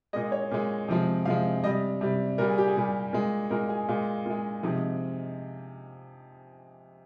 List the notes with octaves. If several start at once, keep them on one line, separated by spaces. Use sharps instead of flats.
A#2 G#3 D#5
C#5
A#2 G#3
C3 F3 G#3
C3 F3 G#3 F5
C3 G3 D#5
C3 G3
A#2 G3 A#4
G#4
G4
G#4
A#2 G3
A#2 G#3
A#2 G#3 A#4
G#4
A#2 G#3 F4
A#2 G#3
C3 F3 G#3 D#4